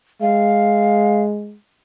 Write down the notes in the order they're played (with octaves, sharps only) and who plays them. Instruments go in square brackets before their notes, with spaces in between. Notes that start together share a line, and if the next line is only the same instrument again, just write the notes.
[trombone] G#3 [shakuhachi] F5